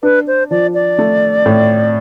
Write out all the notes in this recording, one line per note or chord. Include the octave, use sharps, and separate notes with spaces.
D4 B4
C5
F3 D5
D5
A3
A2